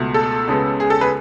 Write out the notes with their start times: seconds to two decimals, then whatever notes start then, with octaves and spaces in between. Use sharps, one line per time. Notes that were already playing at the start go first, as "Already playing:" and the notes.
Already playing: C#2 B2 A3
0.14 A4
0.47 C#2 C#3 G#3 B3
0.80 G#4
0.90 A4
1.01 G#4 B4